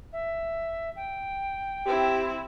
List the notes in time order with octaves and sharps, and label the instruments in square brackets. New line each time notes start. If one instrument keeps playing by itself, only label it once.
[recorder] E5
G5
[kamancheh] C4 E4 [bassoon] G4